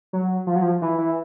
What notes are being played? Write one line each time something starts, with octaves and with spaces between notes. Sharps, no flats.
F#3
F3
F#3
F3
E3
E3